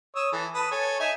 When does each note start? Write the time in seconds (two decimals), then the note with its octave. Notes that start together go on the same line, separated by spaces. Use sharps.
0.16 C#5 D#6 E6
0.33 E3 A4
0.54 B4 A5 D#6
0.71 A4 C#5 G#5
1.00 D#4 E5 G#5